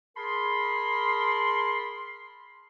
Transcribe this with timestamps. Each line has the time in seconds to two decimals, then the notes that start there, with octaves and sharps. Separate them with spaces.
0.16 G#4 A#4 A5 B5 C6